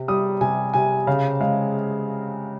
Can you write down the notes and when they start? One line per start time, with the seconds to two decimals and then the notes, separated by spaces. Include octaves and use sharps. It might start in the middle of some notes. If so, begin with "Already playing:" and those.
Already playing: C3
0.08 G3 D#6
0.41 C3 G#5
0.74 C3 G#5
1.07 C#3 F5
1.40 G#3 F5